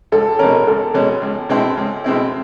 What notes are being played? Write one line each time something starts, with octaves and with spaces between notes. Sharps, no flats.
C#2 A4
B2 G#3 C#4 A#4
C#2 A4
B2 G#3 C#4
C#2
B2 G#3 C4 E4
C#2
B2 G#3 C4 E4